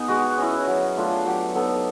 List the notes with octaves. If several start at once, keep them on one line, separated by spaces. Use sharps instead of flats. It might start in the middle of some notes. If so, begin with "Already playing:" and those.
Already playing: B3 D#4 G#4
G#3 F#4
C#4 E4
F#3
A3 D4 F4
F#3 G4
B3 D#4 A4